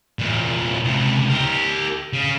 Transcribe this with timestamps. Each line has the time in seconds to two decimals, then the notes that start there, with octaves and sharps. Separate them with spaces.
0.19 E2 A#2
0.84 C#2 C3
1.30 G4 A#4
2.13 C#3